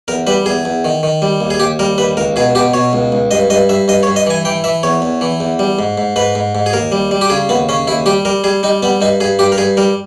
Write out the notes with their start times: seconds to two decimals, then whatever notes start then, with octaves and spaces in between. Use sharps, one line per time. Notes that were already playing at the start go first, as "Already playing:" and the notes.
0.08 E2 A#4
0.27 G3 B4
0.46 E2 G#4
0.65 E2
0.84 D#3
1.03 D#3
1.22 G3
1.41 D#2
1.50 G#4
1.60 D#2 G4
1.79 G3 A#4
1.98 D#2 B4
2.17 C#2 A#4
2.36 B2 G#4
2.55 B2 G4
2.74 B2 C#5
2.93 C#2
3.12 C#2
3.31 G2 D#5
3.50 G2 D#5
3.69 G2 E5
3.88 G2 D#5
4.03 C#5
4.07 G2
4.16 D#5
4.26 E3 G#5
4.45 E3 G5
4.64 E3 E5
4.83 E2 C#5
5.02 E2
5.21 E3
5.40 E2
5.59 G3
5.79 G#2
5.98 G#2
6.16 G#2 B4
6.35 G#2
6.55 G#2
6.66 G#4
6.73 D#2 A#4
6.92 G3
7.11 G3
7.21 G4
7.30 C#3 G#4
7.49 D#2 B3
7.69 C#3 C#4
7.87 D#2 E4
8.06 G3 G4
8.25 G3 A#4
8.44 G3 G#4
8.63 G3 D#4
8.83 G3 B3
9.01 G2 D#4
9.20 G2 G#4
9.39 G2 G4
9.52 A#4
9.58 G2 G#4
9.77 G3 A#4